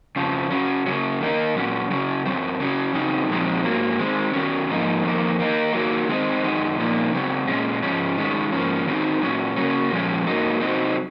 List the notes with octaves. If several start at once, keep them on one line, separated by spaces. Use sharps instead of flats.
F2 C#3 F3
C#3 F#3 C#4
F#2 C#3 F#3 C#4
D#3 A#3 D#4
A#2 F#3 C#4
C#3 F#3 C#4
F#2 C#3 F#3 C4
C#3 F#3 C#4
C#3 F#3 C4 D#4
A#2 F3 G#3 C4 D#4
G#2 F#3 A#3
D#3 G#3 C4
D#3 F#3 C#4
G#2 F3 A#3 D#4
F2 D#3 A#3
D#3 A#3 D#4
D#3 F#3 A#3
D#3 G#3 C4 D#4
F#2 D#3 G#3 D#4
A#2 F3 A#3 D#4
C#3 F#3 C4
A#2 G#3 C#4
G#2 F3 G#3 C#4
D#3 G#3 C#4
G#2 F3 A#3 C#4
D#3 F#3 C4 D#4
A#2 F#3 C#4
C#3 F#3 A#3 C#4
A#2 F3 G#3 C#4
G#2 F#3 A#3 D#4
C3 F#3 C4 D#4